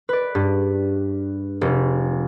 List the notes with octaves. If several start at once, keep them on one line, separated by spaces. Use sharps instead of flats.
B4 D5
G2
F1